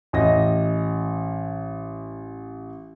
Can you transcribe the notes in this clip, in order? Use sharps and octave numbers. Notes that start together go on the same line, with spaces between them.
A1 D#5 A#6